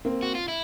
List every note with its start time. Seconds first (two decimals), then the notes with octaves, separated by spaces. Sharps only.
0.05 A#3 C4
0.23 F#4
0.35 F4
0.48 E4